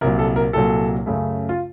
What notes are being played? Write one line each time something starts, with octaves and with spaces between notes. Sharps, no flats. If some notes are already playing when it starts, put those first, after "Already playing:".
C2 A#2 F#3 A#4
A4
A#4
C2 A#2 F#3 A4
F#2 C#3 A3
F4